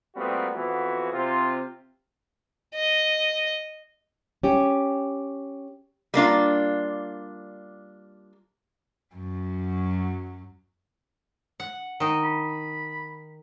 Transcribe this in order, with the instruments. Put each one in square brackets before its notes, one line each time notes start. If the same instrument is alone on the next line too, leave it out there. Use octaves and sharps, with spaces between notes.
[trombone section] A#2 G3 A3 B3 C4 F#4
F2 E3 F3 B3 F#4
C3 C4 F4
[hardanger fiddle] D#5
[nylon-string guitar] C#4 G4
[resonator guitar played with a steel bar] G3 A#3 D4 F4
[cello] F#2 F#3
[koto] F#5
D#3 D#4
[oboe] B5